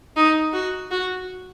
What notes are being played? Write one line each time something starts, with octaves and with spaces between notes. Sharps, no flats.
D#4
F#4
F#4